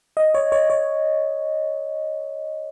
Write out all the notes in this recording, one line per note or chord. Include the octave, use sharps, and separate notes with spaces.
D#5
C#5
C#5
C#5